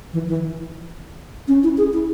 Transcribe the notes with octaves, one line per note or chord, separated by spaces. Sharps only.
E3
E3
C#4
E4
G#4
E4